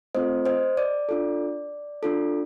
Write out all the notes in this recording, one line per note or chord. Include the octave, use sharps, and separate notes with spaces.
A3 C4 F4 A4 C5 D#5
C5 D#5
D5
D4 F4 A4
D4 F4 A4